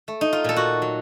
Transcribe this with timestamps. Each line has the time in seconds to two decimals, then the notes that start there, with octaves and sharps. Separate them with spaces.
0.08 A3
0.21 D#4
0.33 F4
0.44 A#2 A4
0.57 F#4
0.82 F#3